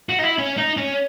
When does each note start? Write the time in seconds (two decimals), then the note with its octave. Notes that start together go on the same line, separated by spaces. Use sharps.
0.09 F#4
0.19 D#4
0.23 E4
0.38 C#4
0.58 D#4
0.77 C#4